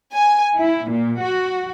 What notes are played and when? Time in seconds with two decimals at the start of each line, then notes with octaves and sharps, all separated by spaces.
0.12 G#5
0.58 E4
0.88 A#2
1.21 F#4